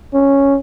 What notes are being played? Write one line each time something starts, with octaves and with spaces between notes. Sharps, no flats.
C#4